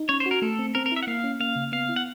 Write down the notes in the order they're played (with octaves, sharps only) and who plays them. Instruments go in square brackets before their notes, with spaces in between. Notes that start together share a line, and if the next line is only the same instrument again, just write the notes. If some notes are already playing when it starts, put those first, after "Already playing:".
Already playing: [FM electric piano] D#4
[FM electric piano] C#4 [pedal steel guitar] C#5
[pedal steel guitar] C5
[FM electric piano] F#4
[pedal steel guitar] A#4
[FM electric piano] A3 [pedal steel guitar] A4
[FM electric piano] C4
[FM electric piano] C4 [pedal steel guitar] A#4
[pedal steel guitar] A#4
[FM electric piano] E4 [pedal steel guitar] E5
[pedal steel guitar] F#5
[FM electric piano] A#3 [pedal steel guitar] F5
[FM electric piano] C#4
[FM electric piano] A#3 [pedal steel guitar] F5
[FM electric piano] C#3
[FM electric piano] B3 [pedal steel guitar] F5
[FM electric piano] E4
[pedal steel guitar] F#5